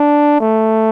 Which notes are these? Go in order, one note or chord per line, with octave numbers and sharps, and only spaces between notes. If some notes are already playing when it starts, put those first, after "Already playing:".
Already playing: D4
A3